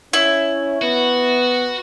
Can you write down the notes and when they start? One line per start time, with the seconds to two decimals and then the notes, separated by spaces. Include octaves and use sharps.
0.13 C#4 E4
0.82 B3 F#4